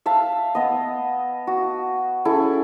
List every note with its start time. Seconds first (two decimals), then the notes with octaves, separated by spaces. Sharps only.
0.06 E5 F5 A5
0.55 B3 D#5
1.47 F#4
2.25 C#4 E4 G#4 A4